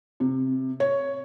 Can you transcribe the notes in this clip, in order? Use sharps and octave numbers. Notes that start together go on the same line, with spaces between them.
C3
C#5